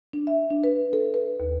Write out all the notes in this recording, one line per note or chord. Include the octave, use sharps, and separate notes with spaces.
D4
E5
D4
B4
A4
B4
D#2